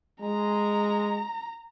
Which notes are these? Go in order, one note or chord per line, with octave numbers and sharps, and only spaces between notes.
G#3 A#5